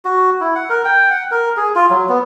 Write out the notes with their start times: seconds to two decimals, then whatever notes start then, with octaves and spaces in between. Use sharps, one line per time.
0.05 F#4
0.41 E4
0.55 F#5
0.70 A#4
0.85 G5
1.11 F#5
1.31 A#4
1.57 G#4
1.75 F4
1.91 F#3
2.09 B3